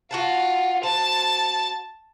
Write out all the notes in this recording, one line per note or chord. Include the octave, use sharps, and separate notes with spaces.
F4 F#4 F#5 A5
F#4 C5 A5